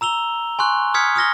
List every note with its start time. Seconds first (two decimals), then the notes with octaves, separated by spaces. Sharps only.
0.01 A#5 E6 F7 G7
0.59 G#5 C6 C#6 F#6
0.94 D#6 F6 G#6 B6 C#7
1.16 D#6 F6 A#6 G7